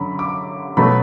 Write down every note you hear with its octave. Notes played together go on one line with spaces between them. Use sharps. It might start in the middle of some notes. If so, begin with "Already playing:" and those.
Already playing: F#2 D3 F#3 B5
D6
B2 F#3 A3 B5